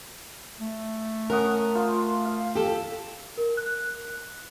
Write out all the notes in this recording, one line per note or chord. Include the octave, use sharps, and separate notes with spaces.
A3
C#4 A#4 F#5 D#6
F4 C5
F5
G4 A4
A#4
F#6